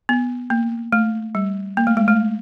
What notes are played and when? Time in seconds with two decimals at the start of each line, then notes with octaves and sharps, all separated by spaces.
0.09 B3
0.50 A#3
0.92 A3
1.35 G3
1.77 A#3
1.87 A3
1.97 G#3
2.08 A3